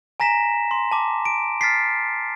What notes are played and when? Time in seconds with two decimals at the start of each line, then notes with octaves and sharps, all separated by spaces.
0.20 G#5 A#5 A#6 B6 E7
0.71 C6
0.91 A5 D6
1.25 D7
1.61 F6 A6 B6 C7